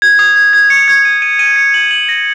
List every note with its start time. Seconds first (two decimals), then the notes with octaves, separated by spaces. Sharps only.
0.02 G#6
0.19 D#6
0.36 G#6
0.53 G#6
0.70 C#7
0.88 G#6
1.05 D#7
1.22 D#7
1.39 D#7
1.56 C#7
1.74 F#7
1.91 F#7
2.09 A#6